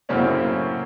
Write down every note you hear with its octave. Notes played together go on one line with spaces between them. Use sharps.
F#2 A2 C#3 A#3 C4 C#4